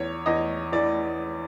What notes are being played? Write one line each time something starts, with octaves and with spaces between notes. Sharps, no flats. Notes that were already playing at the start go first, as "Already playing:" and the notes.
Already playing: E2 C#5
E2 D#5
E3 D5